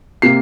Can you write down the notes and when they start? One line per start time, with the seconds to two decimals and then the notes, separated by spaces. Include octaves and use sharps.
0.22 C3 A#3 C7